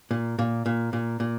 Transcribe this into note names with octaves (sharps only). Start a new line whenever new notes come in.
A#2
A#2
A#2
A#2
A#2